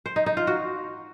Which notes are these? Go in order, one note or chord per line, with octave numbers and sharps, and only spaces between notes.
C5
D#4
D#4
F4
F#4